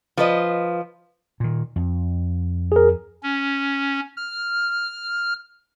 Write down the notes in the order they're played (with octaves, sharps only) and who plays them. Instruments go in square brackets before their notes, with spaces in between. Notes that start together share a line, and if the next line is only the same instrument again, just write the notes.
[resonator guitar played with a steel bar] F3 B4 D#5
[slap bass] A#2 D#3
F2
[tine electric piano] G#4 A#4
[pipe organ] C#4
F6